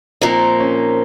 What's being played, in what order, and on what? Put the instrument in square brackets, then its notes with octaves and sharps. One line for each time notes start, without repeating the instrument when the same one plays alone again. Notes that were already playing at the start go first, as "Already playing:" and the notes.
[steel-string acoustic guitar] A#2 F3 A#3 D#4 [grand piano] C4
[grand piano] C#4